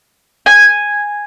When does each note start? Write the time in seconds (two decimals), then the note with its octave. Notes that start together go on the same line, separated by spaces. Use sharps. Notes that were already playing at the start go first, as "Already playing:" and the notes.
0.46 G#5